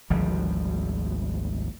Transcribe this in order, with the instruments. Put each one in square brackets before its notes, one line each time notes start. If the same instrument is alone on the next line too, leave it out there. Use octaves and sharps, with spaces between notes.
[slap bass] G#1 D2 F3 G3